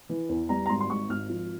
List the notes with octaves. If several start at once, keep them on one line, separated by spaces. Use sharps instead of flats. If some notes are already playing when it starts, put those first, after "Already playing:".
E3
E2
G3 A#5
A#5
G#1 C6
C6
G#2 C#6
G#1 F6
F3